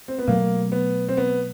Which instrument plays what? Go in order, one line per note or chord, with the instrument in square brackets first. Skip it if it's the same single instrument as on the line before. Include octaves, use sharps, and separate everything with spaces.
[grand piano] C4
B3
[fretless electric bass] B2 F#3 A3 [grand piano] A#3
[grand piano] B3
C4
B3